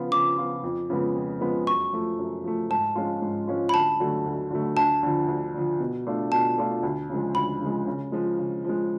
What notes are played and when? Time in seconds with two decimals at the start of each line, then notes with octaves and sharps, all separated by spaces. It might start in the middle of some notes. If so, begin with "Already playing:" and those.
Already playing: C#3 F3 B3 F4
0.12 C#3 D6
0.38 F3 B3 F4
0.64 F2
0.90 C#3 F3 G#3 B3
1.15 F2
1.41 C#3 F3 G#3 B3
1.67 F#2 C#6
1.93 F3 A3
2.19 F#2
2.44 F3 A3
2.70 G#2 A5
2.95 F3 G#3 C#4 F4
3.22 G#2
3.47 F3 G#3 C#4 F4
3.69 B5
3.74 D2 A5
4.00 D3 F#3 A3
4.26 D2
4.51 D3 F#3 A3
4.77 D2 A5
5.03 D3 F3
5.28 D2
5.54 D3 F3
5.80 B2
6.07 A3 D4 F4
6.32 B2 A5
6.58 A3 D4 F4
6.83 D2
7.10 C#3 F3 G#3
7.35 D2 B5
7.61 C#3 F3 G#3
7.87 C#3
8.12 F3 G#3
8.39 C#3
8.64 F3 G#3